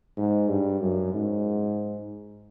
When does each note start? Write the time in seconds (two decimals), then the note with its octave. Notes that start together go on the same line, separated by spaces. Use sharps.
0.17 G#2
0.49 G2
0.81 F#2
1.14 G#2